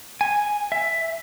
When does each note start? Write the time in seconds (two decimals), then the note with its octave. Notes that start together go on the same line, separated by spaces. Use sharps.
0.21 G#5
0.72 E5